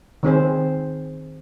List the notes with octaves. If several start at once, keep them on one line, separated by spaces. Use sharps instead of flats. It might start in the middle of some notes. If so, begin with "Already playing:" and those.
D#3 C4 G#4 C5